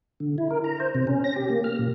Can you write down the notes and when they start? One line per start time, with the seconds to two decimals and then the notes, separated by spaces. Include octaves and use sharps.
0.20 D3
0.38 E4
0.50 A#4
0.64 A#5
0.80 C5
0.95 C3
1.07 C#4
1.24 A#6
1.36 G4
1.50 A#3
1.64 F6
1.79 A#2